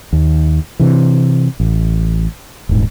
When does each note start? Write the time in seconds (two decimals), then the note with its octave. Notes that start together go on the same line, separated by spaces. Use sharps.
0.13 D#2
0.79 C3 E3
1.60 A1
2.69 D#1 G#2